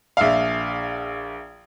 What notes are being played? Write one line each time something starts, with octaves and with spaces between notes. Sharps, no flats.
A#1 E5 F5